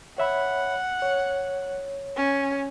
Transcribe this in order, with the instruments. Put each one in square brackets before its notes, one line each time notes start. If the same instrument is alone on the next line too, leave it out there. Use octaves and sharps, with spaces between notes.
[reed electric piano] C#5 E5 B5 [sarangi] F#5
[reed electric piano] C#5
[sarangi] C#4